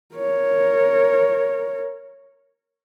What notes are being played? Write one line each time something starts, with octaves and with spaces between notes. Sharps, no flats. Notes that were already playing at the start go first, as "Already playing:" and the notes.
A#4 C#5